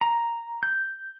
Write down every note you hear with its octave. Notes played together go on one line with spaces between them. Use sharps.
A#5
G6